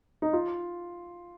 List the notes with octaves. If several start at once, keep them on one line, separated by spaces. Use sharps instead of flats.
D#4
F4